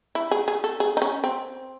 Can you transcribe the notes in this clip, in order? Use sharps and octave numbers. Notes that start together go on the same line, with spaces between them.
E4
G#4
G#4
A4
G#4
D#4
C#4
C4